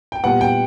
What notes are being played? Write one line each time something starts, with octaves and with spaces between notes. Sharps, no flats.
G5
A#2 G3 B3 F#5
G5